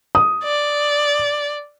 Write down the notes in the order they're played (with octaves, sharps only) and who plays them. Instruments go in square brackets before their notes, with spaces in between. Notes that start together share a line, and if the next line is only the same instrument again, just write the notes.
[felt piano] D#6
[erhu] D5